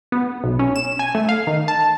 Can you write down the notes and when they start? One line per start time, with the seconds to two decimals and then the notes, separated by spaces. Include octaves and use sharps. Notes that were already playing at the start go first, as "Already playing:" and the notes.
0.12 B3
0.44 B1
0.59 C#4
0.76 E7
0.99 G#5
1.15 A3
1.29 F5
1.47 D#3
1.68 A5